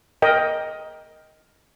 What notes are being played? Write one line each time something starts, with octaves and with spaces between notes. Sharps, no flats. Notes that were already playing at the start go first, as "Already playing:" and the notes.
A#4 D#5 G5